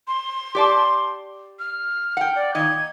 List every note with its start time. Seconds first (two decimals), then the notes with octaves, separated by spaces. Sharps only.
0.07 C6
0.55 G4 D5 A5
1.59 F6
2.17 F#5 G5
2.36 D5
2.55 A#2 D#3 D#5 G#6